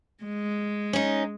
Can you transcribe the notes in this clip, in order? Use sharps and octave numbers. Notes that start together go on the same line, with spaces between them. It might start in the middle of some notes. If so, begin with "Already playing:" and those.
G#3
C#4 D#4